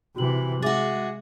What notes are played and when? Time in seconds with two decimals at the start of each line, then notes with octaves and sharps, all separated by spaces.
0.16 C3 E3 F#4 F#7
0.62 G#3 F#4 G#4 E5 D6 A6